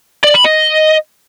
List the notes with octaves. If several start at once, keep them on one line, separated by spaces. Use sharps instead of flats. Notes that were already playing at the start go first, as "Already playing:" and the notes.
D5
B5
D#5